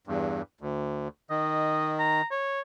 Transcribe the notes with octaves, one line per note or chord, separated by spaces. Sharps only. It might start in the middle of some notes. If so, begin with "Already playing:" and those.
E2 G2
D2
D#3 D#5
A#5
C#5